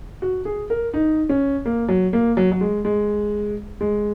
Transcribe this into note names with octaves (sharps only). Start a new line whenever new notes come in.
F#4
G#4
A#4
D#4
C#4
A#3
F#3
A#3
F#3
F#3
G#3
G#3
G#3